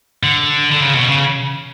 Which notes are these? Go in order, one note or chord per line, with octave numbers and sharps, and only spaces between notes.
D3
D3
C#3
B2
C#3